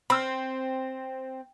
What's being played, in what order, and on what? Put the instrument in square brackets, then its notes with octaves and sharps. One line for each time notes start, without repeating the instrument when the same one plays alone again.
[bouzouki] C4 [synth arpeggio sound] B5 E6 F6